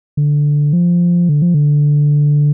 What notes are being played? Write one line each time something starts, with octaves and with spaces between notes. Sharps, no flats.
D3
F3
D3
F3
D3